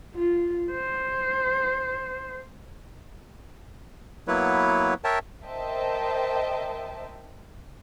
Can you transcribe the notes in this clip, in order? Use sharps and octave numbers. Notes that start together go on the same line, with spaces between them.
F4
C5
F#3 A#3 B3 E4 B4 C#5
A#4 C#5 E5 G5 A5
A#4 C5 D#5 E5 G5 A5